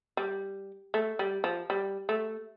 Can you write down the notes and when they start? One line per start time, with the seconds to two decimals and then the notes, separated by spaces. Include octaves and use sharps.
0.17 G3
0.94 A3
1.19 G3
1.44 F3
1.70 G3
2.09 A3